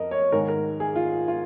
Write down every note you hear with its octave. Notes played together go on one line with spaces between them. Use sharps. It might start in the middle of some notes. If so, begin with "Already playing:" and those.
Already playing: F2 F3 A#4 D#5
C#5
G#2 D#3 G#3 A#4
A#4
G#4
F4
F4